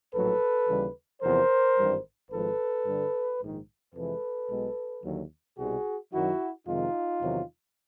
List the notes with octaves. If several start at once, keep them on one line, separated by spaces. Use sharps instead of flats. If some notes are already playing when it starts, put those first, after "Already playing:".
A#1 A2 F#3 A4 B4
D#2 C#3 E3 G3
E2 C3 F3 A#4 C5
G#1 G2 E3 G3
G#1 G#2 F3 G#3 A4 B4
G2 D3 G3
A#1 G#2 D#3
F2 C3 E3 G#3 A4 B4
B1 B2 G#3
D#2 D3 F#3
C2 B2 G3 F#4 G#4
F#2 D#3 F#3 E4 F#4
F2 C3 D#3 G#3 D#4 F4
E2 C3 D#3 F#3